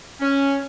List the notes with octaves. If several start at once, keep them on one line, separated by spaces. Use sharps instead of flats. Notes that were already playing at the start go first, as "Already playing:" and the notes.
C#4